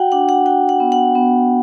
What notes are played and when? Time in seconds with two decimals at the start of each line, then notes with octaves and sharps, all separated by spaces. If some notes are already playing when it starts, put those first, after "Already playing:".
Already playing: F#4 F#5 G5
0.12 D4 F#5
0.29 F#5
0.46 F#4 G5
0.69 F#5
0.80 B3
0.92 F#5
1.15 B3